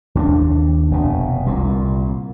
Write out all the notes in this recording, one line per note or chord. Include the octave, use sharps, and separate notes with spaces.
D#2 C#4 D4
F1 B2
C2 A#2